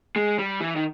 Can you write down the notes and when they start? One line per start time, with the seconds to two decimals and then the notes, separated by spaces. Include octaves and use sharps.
0.16 G#3
0.39 G3
0.61 E3
0.76 D#3